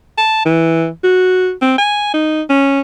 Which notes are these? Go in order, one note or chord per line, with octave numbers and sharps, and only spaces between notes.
A5
E3
F#4
C4
G#5
D#4
C#4